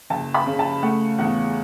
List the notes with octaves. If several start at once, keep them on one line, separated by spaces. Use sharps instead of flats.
F#1 A5
B5
C#3
A5
A3 F#5
E2 F#5